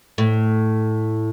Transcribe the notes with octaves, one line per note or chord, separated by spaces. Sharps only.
A2